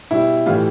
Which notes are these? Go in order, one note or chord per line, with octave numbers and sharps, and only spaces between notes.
B2 G3 E4
A2 E3 G3 F4